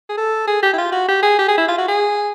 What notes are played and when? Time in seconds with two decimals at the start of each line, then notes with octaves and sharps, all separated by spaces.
0.09 G#4
0.17 A4
0.47 G#4
0.63 G4
0.73 E4
0.78 F4
0.92 F#4
1.08 G4
1.22 G#4
1.38 G4
1.48 G#4
1.58 E4
1.68 F4
1.78 F#4
1.88 G#4